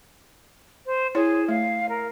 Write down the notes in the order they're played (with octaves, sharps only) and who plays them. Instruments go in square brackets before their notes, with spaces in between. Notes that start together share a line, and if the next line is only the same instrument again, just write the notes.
[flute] C5
[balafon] E4 C#5 [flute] G#4
[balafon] A3 [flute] F5
[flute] A#4